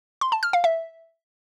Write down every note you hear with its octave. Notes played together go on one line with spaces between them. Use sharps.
C6
A5
F6
F5
E5